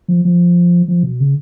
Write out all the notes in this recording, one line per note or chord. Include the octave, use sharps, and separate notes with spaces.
F3
F3
F3
B2
C#3